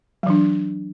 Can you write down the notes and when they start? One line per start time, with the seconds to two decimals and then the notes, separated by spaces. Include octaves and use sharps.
0.23 F#3
0.27 E3
0.30 D4